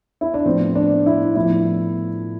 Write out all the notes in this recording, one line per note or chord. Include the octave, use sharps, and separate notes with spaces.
E4
D4
A2 F3 B3 C4
D4
E4
A2 F3 B3 E4